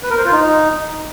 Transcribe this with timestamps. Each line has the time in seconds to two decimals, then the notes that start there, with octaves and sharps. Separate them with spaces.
0.03 B4
0.10 A#4
0.18 C5
0.25 F4
0.32 D#4